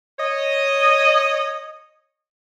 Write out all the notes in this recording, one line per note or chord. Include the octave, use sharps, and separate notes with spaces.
C#5 D#5